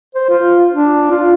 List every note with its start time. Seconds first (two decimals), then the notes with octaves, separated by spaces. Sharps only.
0.15 C5
0.29 F4
0.73 D4
1.11 F4